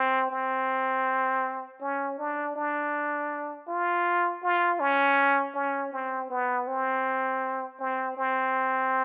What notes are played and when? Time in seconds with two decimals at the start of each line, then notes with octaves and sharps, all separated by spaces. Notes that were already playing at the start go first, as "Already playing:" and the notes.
Already playing: C4
0.31 C4
1.81 C#4
2.18 D4
2.56 D4
3.68 F4
4.43 F4
4.80 C#4
5.55 C#4
5.93 C4
6.30 B3
6.67 C4
7.80 C4
8.17 C4